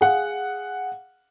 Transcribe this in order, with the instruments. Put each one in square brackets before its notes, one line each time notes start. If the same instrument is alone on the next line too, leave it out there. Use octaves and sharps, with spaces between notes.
[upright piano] G#4 F5 F#5